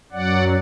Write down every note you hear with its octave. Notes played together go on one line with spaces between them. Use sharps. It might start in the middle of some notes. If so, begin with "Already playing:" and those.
F#2 F#3 D5 F#5